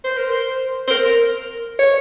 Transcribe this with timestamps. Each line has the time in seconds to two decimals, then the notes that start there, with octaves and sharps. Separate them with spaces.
0.04 C5
0.17 A#4
0.30 C5
0.87 C5
0.91 A#4
1.79 C#5